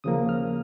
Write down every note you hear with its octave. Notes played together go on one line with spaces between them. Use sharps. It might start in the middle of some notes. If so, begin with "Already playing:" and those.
D#2 C#3 F3 A#3 D#6
F6